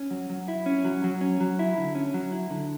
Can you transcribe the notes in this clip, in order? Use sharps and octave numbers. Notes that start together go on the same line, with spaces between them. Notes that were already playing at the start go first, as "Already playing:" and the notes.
Already playing: C#4
F#3
F#3
E4
C#4
F#3
F#3
C#4
F#3
E4
D3
C#4
F#3
E4
D3